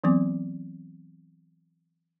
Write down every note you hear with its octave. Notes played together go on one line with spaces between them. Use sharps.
E3 F#3 B3 C4 D6